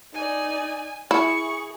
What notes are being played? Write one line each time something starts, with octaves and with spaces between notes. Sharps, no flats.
D#4 D5 G#5
E4 G#4 C#6